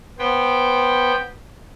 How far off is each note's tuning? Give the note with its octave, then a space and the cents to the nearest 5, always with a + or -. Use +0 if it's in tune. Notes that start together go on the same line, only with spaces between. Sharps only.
B3 -10 C5 +0 G5 +0